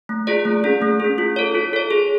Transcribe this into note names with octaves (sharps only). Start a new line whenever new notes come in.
A3
F4 G#4 D5
A3
C#4 G#4
A3
C#4 G#4
F4
A4 C#5
F4
A4 C#5
G#4